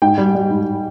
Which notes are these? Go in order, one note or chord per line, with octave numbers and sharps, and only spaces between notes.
G#2 G5
G3
G3
G#2